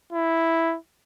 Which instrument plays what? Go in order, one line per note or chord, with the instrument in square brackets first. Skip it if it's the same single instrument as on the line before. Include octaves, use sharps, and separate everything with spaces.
[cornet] E4